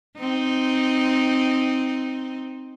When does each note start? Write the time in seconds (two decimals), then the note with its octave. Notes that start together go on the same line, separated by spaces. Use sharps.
0.18 C4 D#4